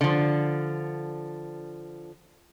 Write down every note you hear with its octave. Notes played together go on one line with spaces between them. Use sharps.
D3 F3